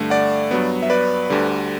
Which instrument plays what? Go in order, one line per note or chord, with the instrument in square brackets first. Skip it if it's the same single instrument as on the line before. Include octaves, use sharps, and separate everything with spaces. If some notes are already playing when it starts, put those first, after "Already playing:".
Already playing: [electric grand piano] G2 D3 A3
D5 F#5
G2 F#3 B3
E5
B4 D5
D2 D3 G3